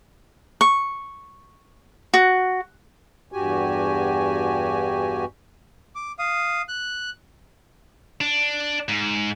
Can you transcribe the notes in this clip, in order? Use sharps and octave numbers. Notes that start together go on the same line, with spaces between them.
C#6
F#4
E2 G2 F#4 G4 G#5
D6
F5 D#6
F#6
D4
G#2